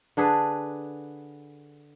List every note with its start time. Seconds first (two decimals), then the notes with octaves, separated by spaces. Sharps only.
0.17 D3 D4 G#4 B4